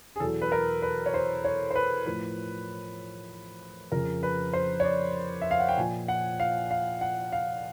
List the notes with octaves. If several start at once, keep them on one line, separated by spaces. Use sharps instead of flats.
G#4
E2 B2 F#3 A4
B4
A#4
B4
C#5
C5
C#5
C5
B4
A2 F3 B4
F2 C#3 F3 A#4
B4
C5
C#5
D5
E5
F5
F#5
G5
A#2 F3 G#5
F#5
F5
F5
F#5
F5